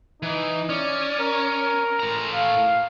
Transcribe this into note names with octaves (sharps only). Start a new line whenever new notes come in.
E3 D#4
C#4 D5
A#4
A2 A#5
F5